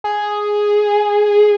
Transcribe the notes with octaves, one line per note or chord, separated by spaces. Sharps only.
G#4